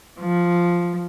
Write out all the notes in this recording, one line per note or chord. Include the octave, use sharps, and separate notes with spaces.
F3